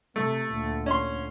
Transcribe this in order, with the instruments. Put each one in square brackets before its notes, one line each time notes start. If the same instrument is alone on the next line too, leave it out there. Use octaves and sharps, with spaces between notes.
[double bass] C3 [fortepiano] A3
[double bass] D2 A#2
[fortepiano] C#4 C6